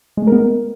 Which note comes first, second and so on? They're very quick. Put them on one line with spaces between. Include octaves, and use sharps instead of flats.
G#3 A3 A#4 B3